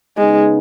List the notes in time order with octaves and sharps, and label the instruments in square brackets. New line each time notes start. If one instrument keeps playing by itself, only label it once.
[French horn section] C#3 B3 D#4 [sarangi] G#3